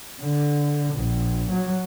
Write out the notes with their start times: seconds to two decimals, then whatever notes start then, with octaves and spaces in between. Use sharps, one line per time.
0.22 D3
0.95 A#1
1.51 F#3